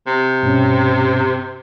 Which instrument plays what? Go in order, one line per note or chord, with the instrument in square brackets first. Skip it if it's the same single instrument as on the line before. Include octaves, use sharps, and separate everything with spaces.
[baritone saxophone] C3
[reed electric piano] G2 B2 C#4